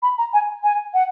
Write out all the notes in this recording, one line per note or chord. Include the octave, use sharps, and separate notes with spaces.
B5
A#5
G#5
G#5
F#5